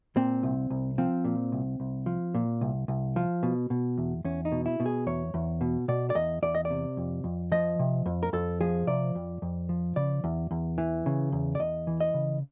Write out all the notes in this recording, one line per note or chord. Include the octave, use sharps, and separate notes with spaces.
A#2 C4
C2
C2
F3 C4
A#2
C2
C2
F3
A#2
C2
C2
F3
B2
B2
E2
E2 C#4
D#4
B2
E4
B2
G#4
E2 C#5
E2
B2
B2 D5
D5
E2 D#5
E2 D5
D#5
D5
C3
F2
F2
F3 D#5
C3
F2
A#4
F2 A4
F3 G#4
C3 D5
F2
F2
F3
C#3 D5
E2
E2
E3
C#3
E2
D5
E2 D#5
E3
D#5
C#3